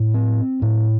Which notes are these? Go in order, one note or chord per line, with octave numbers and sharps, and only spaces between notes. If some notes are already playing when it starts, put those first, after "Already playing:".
Already playing: A2
C4
A2